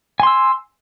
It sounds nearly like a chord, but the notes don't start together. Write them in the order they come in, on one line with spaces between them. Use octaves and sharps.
G#5 C6 E6